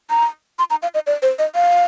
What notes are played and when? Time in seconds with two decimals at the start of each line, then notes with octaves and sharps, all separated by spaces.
0.10 A#5
0.59 C6
0.70 A#5
0.83 F5
0.94 D#5
1.07 D5
1.22 C5
1.39 D#5
1.55 F5